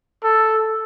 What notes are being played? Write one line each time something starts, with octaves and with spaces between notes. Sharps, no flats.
A4